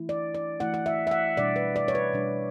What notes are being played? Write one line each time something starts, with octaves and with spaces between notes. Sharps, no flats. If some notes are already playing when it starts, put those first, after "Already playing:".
Already playing: E3 A3 E4
D5
D5
E3 A3 E4 F#5
F#5
E5
E5
F#5
B2 G3 D4 D5
B4
D5
C#5
B4
B2 G3 D4